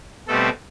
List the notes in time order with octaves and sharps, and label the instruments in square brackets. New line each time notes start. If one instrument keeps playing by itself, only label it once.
[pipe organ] B2 G3 A3 C4 A4